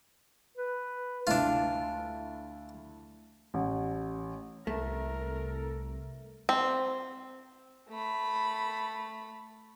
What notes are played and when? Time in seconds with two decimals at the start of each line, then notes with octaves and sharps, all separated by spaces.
0.57 B4
1.27 D2 A3 D4 E4 F4
3.54 A1
4.67 C2 A3 A4 A#4
6.49 C4
7.89 A3 B5